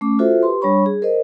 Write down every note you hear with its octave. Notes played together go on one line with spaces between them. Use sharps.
A3 C#4 D6
F4 F#4 A4 C5 E5
G4 B4 C6
G3 D4 C#5 B5 C#6
G#4
A#4 C5 D#5